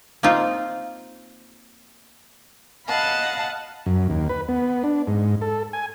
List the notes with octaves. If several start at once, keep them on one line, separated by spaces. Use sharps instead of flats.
A#3 C4 D#4 F4
D#5 F5 F#5 A5 B5
F#2
D#2
B4
B3
D4
G#2
A4
G#5